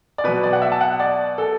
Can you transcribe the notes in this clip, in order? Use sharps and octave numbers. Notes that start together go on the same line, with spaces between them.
D5
B2 F#3 B4
D5
F#5
E5
A5
F#5
D5
A4